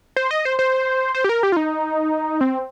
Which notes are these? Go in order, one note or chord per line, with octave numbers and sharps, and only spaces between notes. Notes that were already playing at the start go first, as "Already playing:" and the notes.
C5
D#5
C5
C5
C5
G4
A#4
G4
F4
D#4
C4